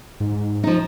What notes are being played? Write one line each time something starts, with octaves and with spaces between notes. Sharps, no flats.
G#2
F3 D#4